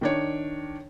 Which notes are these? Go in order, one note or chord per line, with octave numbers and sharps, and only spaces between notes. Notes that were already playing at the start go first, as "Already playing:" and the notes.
D#3 D4 C#5